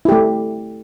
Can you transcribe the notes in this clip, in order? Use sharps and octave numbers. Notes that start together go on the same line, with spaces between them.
A3 E4 G4